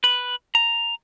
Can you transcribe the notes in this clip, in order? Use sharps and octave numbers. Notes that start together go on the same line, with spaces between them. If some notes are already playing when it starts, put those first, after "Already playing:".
B4
A#5